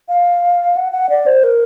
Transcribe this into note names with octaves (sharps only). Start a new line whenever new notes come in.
F5
F#5
F#5
D5
C5
A#4